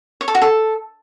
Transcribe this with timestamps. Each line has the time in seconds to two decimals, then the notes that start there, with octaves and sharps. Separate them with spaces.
0.21 C#5
0.28 A4
0.35 F#4
0.42 A4